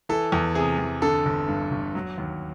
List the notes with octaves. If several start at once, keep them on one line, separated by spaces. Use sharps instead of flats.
E3 A4
E2
C3 G#4
E2
D3 A4
G1
G2
G1
F#3
D#2